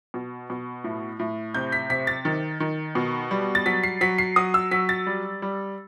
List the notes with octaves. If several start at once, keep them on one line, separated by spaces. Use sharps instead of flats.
B2
B2
A2
A2
C3 G6
B6
C3 B6
A6
D#3
D#3
B2
G3
A6
F#3 B6
C7
F#3 B6
C7
F#3 D#6
E6
F#3 B6
A6
G3
G3